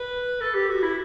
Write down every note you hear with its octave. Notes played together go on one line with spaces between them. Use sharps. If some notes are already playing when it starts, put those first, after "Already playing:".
Already playing: B4
A4
G4
F#4
E4